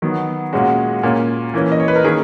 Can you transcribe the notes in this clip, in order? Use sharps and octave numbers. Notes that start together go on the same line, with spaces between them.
D#3 F#3 B3
A#2 G#3 C#4 F#4
A#2 A#3 C#4
E3 A#3 C#4
D#5
C#5
B4
A#4
D#3 A#3 C#4 G#4